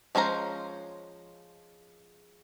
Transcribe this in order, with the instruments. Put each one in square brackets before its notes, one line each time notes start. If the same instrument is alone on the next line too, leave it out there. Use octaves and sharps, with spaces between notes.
[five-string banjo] F3 G#3 C#4 C5 A#5